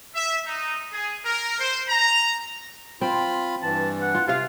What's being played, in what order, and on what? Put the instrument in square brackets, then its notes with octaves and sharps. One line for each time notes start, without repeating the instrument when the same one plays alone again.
[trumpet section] E5
D#4
G#4
A#4
C5
A#5
[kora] C4 [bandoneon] F4 B5
[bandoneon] G2 E3 [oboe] A5
[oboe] F#5
[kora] F4
[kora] C3 F5 [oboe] F4